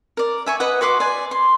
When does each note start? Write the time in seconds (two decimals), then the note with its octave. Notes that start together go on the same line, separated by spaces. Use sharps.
0.17 A#4 D5
0.46 E5 G#5 C#6
0.60 B4 D#5 F#5
0.81 F#4 B4 C6 D6
1.00 D5 G#5
1.31 C6